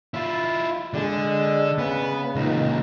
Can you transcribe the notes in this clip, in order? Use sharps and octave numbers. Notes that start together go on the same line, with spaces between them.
E4 F4
D3 G#3 D4
C#3 B3 B4
C#2 A#2 D#4